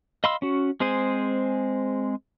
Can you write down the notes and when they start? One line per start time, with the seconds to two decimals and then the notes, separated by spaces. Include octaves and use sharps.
0.24 D#5 F5 B5 C6 E6
0.42 C#4 F#4
0.80 G#3 C4 G#4 C5 G#5